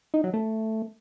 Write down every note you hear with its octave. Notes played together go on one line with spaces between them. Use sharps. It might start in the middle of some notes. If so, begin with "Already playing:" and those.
D#4
F#3
A3